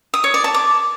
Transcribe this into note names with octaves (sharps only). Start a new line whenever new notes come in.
D#6
C#5
D5
A5
D6